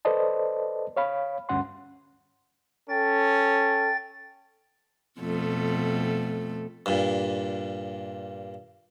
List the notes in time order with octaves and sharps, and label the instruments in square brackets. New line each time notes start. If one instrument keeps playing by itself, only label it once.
[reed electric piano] A4 B4 C5 D5 D#5 A5
C#5 F5 B5
D2 G2 C#4 F#5 C6
[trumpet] C#4 [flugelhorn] A4 [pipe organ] G5 A6
[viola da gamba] F2 B2 A3
[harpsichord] G2 A#2